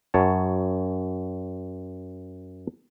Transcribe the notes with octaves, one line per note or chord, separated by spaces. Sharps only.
F#2 C#5 A5